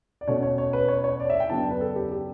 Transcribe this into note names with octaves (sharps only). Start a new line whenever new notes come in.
D5
B2 A3 C#4 C#5
C#5
C#5
B4
C#5
C#5
D5
E5
G5
F#2 C#3 F#3 B3 D4 A5
G5
B4
A4
G4
G4